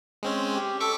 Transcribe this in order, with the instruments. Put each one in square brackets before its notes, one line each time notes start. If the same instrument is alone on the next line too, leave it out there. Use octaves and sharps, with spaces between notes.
[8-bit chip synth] G#3 C4 C#4
[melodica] G4
[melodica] A4 [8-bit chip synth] C#6 D6 B6